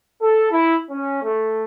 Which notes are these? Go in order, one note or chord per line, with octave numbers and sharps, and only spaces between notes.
A4
E4
C#4
A3